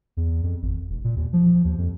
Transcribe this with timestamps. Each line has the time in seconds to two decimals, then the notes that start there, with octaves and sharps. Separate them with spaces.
0.17 E2
0.43 F2
0.62 G#1
0.90 E1
1.04 A#2
1.16 D#2
1.33 F3
1.65 D#2
1.78 F2